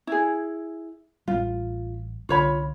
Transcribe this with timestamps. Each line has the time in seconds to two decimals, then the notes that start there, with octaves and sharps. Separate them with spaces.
0.07 E4 G#4
1.28 A1 G3 F4
2.29 C2 D3 F4 C#5 B5